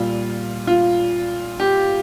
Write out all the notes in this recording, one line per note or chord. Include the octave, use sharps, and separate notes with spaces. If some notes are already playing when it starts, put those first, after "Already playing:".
Already playing: A#2 G3 F4
F4
G4